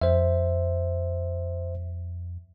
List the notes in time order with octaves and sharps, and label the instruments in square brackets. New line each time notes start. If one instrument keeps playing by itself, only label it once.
[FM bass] F2 [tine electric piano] C5 E5